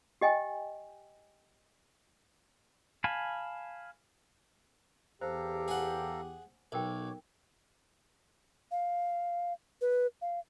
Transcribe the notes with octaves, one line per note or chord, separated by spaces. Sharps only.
G4 D#5 G5 G#5
F5 G#5 A5 B5
E2 G4 A4 C5 F5 A#5
G#4 F#5
B1 A4 A#4 C#5 G5 D6
F5
B4
F5